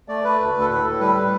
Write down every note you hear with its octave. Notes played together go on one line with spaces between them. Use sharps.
A3 D5
A3 B4
D2
D2
A4
A2 B4
A2 A4
G3 B4
G3